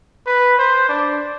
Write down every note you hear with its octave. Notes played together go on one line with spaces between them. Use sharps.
B4
C5
D4